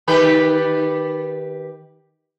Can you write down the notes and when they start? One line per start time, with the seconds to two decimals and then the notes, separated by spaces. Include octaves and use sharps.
0.08 D#3 G4 B4